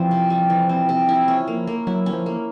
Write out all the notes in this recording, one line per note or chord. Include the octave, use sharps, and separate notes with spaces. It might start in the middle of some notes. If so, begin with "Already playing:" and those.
Already playing: E3 F3 G3 C4
C3
G3
E3
C4
C3
E4
C#4
A#3
A#3
F#3 E4
C#4
F3
A#3